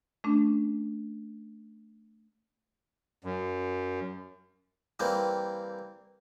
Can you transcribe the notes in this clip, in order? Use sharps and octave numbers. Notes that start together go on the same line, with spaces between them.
A3 C#4 D4
F#2
E3 G3 A#3 C4